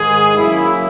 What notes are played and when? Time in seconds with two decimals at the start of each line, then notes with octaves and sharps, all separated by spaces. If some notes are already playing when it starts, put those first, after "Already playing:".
Already playing: G#2 D#3 G#3 G#4
0.35 C#3 F#3 A#3 E4